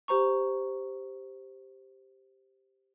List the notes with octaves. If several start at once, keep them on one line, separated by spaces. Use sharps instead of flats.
G4 C5 A#5 C#6